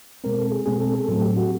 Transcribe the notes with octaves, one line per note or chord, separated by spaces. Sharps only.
B2 G#3 C4 A#4
A4
G#4
B2 G#3 C4 G#4
A4
A4
A2 F#3 A3 C4 A4
G4
F#4